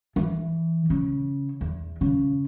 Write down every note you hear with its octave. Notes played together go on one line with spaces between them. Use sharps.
E3
C#3
E2
C#3